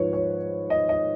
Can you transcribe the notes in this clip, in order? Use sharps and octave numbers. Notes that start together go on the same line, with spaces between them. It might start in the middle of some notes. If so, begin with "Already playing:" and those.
Already playing: G#2 F3 B4 C#5
C#5
D#5
D#5